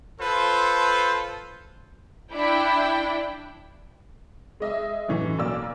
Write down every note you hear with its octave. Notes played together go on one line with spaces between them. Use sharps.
F4 A4 B4 C5
D4 E4 G5
G#3 D#5 E5
F#2 A2 E3
B1 A#3 D5 E6